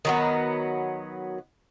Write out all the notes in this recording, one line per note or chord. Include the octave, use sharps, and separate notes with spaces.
D#3 F#3 B3